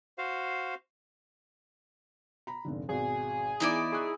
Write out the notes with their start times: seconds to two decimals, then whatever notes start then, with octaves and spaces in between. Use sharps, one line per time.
0.18 F#4 C5 F5
2.47 A#5 B5
2.65 F1 G#2 D3
2.89 G#1 B2 G#4
3.60 E3 B3 D#4 E4 D5
3.92 G#4 C#6 D#6 F#6